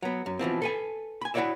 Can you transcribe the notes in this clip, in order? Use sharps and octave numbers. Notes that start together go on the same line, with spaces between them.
F#3 B3
F#2
B2 E3 F3 C4
A4 B4 G#5
G#5 B5
E4 F#4 A4 C#5 D5 E5